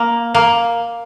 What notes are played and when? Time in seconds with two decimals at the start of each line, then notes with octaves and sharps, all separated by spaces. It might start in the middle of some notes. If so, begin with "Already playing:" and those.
Already playing: A#3
0.34 A#3